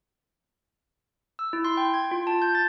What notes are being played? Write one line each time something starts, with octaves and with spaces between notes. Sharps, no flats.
E6
E4
C6
G5
G#6
F4
A5
G6
A6